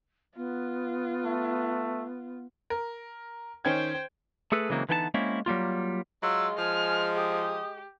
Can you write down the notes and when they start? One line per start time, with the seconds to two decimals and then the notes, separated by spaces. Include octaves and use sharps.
0.37 B3 F4
1.25 A3
2.70 A#4
3.65 D#3 C#4 C5 G5 G#6
4.52 A3 G#4 A4 B4
4.70 C#3 E3 F#3 G#3 A#3 C4
4.89 D3 E3 B3 D#4 G5 A5
5.14 G#3 A#3 C4 C#4 E4
5.46 F#3 G3 A#3 F4
6.23 F#3 G#3 F4 E6
6.59 F3 G#5 F6
7.16 G4 D#6